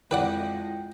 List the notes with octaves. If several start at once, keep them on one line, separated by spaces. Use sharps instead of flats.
F2 G#3 E4 B4 D5 F#5 G5